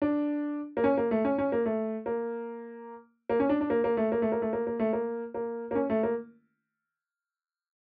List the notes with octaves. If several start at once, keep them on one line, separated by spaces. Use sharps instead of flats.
D4
A#3
C#4
A#3
A3
C#4
C#4
A#3
A3
A#3
A#3
C#4
D4
D4
A#3
A#3
A3
A#3
A3
A#3
A3
A#3
A#3
A3
A#3
A#3
A#3
C#4
A3
A#3